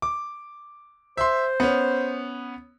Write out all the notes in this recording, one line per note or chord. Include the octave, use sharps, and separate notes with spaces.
D6
C5 E5 C6
B3 C#4